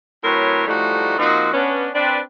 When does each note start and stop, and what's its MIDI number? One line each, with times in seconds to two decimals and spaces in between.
0.24 0.66 45
0.24 0.66 54
0.24 0.66 60
0.24 0.66 70
0.24 0.66 71
0.24 0.66 73
0.68 1.19 45
0.68 1.19 53
0.68 1.19 55
0.68 1.19 57
0.68 1.19 63
0.68 1.19 66
1.19 1.51 53
1.19 1.51 58
1.19 1.51 60
1.19 1.51 63
1.19 1.51 66
1.54 1.89 59
1.54 1.89 61
1.54 1.89 62
1.95 2.20 60
1.95 2.20 62
1.95 2.20 71